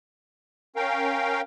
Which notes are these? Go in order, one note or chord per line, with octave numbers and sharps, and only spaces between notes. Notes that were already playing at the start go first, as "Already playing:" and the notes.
C#4 A#4 F5 G5